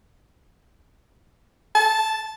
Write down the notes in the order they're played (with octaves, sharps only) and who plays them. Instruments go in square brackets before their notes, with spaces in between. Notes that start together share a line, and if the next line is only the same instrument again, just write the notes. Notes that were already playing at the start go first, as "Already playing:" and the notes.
[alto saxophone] A5